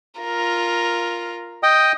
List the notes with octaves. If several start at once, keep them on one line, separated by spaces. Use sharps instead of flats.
F4 A#4
D#5 G5 D#6